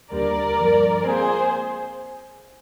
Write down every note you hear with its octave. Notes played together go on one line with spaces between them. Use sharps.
D#2 D3 G3 A#3 A#4 D5
G2 D3 F3
A#2 G#3 C4 G#4 C5